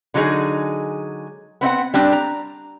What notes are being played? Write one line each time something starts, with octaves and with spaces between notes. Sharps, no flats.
D3 F#3 G#3 D#4 G#4
B3 C4 E5 F#5
G3 C4 D4
A#5